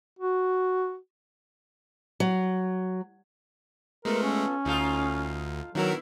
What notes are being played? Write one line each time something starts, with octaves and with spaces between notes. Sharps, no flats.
F#4
F#3
G#3 A3 B3 F4 A4 A#4
C#4
D2 D#4 F4 A4
D#3 F#3 B3 D4 E4 F#4 A#4